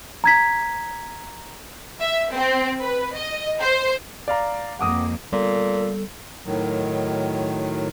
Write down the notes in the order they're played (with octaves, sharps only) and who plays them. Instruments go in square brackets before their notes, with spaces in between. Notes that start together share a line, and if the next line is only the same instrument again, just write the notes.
[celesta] A#5 G#6 B6
[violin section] E5
C4
B4
D#5
C5
[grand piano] D5 F5 A#5
[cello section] F2 A#3 [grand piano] F#5 D6 D#6
[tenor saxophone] A#2 [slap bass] G3 B3 [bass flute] A4
[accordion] A2 D#3 F#3